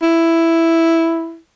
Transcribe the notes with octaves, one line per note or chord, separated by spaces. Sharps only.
E4